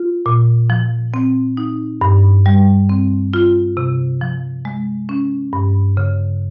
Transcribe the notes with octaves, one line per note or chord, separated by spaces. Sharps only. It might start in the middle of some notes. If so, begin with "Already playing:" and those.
Already playing: F4
A#2
F3
C4
D#4
G2
G3
C4
F4
C3
F3
G#3
C#4
G2
C#3